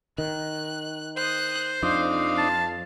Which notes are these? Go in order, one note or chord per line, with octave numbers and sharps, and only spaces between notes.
D#3 F#6
C5 D#6 F#6
F2 C4 D4 D#4 F5
A5